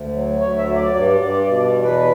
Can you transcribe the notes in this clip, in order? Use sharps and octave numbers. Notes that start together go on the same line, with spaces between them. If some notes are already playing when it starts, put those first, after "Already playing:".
Already playing: D2
F#3
D2 C#5
E5
F#3
D5
G2 D5
G2 D5
B2 D5
D5
E2
B4